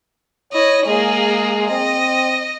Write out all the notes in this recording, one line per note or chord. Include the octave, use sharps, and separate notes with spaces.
E4 C#5 D#5
G#3 A#3 G#4
C4 D#5